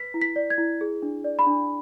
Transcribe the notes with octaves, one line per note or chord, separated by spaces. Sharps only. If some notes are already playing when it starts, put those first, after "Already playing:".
Already playing: B4 B6
E4
B6
D5
G#6
E4
G#4
D4
D5
B5
D4